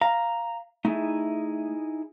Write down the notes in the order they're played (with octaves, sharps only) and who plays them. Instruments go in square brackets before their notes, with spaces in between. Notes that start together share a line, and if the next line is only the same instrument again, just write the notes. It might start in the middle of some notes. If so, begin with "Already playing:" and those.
[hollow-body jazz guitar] F5 [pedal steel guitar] A#5
[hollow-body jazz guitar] A3 [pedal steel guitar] D#4 E4 G#4